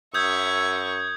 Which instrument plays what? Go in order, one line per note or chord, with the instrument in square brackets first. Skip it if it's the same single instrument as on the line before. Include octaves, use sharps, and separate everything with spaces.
[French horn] F#2 [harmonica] E5 [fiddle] C#6 [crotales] D#6 G6 G#6